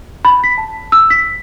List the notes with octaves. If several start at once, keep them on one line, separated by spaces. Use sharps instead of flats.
B5
B6
A5
E6
B6